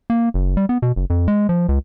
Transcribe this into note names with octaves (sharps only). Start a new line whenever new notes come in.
A#3
F#1
G3
B3
B2
F#1
F2
G#3
F3
C#2